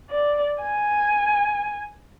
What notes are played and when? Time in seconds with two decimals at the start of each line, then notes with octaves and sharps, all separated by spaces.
0.10 D5
0.62 G#5